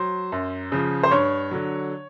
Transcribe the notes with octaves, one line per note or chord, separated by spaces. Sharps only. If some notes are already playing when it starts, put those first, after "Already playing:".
Already playing: F#3 C5
F#2
C#3 F3
C5
G2 C#5
D3 F#3